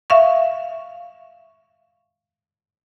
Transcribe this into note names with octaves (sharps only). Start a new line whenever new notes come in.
E5 F5 C#6